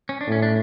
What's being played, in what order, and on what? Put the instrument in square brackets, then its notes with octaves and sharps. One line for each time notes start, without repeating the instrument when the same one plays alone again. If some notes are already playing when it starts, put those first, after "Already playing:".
[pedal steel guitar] C#4
D4
[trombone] A2
[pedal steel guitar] C#4
D4